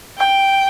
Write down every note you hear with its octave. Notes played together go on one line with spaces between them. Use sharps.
G5